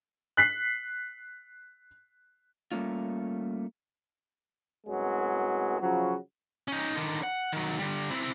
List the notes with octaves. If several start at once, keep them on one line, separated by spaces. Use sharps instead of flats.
F#6 B6 C7
G3 A3 A#3 C#4 F4
C2 F#2 F#3 G#3 B3
C#3 F3 F#3
C#4 D#4
D3 D#3
F#5
D#3 F#3
D3 G3
C4 E4